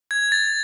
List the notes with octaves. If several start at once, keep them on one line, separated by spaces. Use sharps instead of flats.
G#6
A6